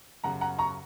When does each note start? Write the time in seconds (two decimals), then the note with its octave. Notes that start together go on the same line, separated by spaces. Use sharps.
0.24 F#2 C#3 F#5 A#5
0.41 F#5 A#5
0.58 A#5 C#6